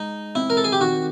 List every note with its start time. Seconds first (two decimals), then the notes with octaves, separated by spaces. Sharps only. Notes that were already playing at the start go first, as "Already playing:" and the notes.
Already playing: G#3 D#4
0.35 C4 E4
0.50 A#4
0.57 A4
0.64 G#4
0.73 G4
0.80 D#3 F#4